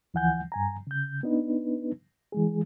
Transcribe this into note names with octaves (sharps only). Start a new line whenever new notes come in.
D2 E3 F3 F#5 G#5 G6
G2 G#5 A#5
C#3 G6
B3 D4 D#4 B4
E3 G#3 G#4